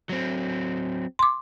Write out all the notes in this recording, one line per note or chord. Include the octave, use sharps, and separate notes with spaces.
F#3 C4
C6 D6